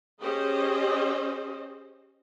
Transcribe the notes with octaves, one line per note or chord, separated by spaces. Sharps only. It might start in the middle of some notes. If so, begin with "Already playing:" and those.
C#4 G4 G#4 C5 D#5